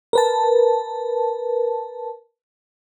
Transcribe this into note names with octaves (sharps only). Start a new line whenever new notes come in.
A#4 B4 A5